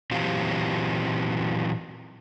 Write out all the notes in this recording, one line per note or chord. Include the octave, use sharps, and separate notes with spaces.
A#2 E3 F#3 C4 F4 G4